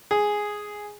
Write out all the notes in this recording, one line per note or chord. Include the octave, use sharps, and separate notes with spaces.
G#4